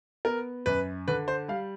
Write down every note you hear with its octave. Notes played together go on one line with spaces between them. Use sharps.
B3 A#4
F#2 B4
D3 B4
C5
G3 F5